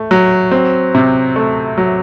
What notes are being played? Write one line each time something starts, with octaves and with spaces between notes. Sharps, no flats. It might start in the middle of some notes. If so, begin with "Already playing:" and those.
Already playing: A3
F#3
C4
C3
A3
F#3